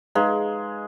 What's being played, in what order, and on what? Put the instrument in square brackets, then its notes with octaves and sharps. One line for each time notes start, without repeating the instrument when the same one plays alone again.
[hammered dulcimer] G#3 [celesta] D#4 G#4 B4 F5 A#5